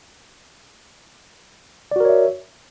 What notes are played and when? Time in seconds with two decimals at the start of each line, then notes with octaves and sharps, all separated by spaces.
1.91 D5
1.96 F#4
2.00 A#4
2.05 C#5
2.09 E5